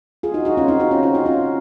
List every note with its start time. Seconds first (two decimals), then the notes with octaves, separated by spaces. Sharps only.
0.23 F4 G#4
0.34 D#4 F#4
0.45 D#4 F#4
0.57 C#4 F4
0.68 C4 D#4
0.79 D#4 F#4
0.91 C#4 F4
1.03 C#4 F4
1.14 D#4 F#4
1.26 C#4 F4